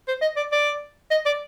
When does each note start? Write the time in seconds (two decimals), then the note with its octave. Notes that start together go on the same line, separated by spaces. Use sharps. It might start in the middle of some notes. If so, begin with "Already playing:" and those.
0.08 C5
0.22 D#5
0.37 D5
0.52 D5
1.11 D#5
1.26 D5